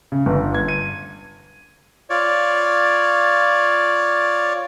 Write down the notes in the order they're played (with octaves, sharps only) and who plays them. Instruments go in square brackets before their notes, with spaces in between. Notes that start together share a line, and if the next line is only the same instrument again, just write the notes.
[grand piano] C#3
G1
G#6
D#7
[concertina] F4 C#5 D5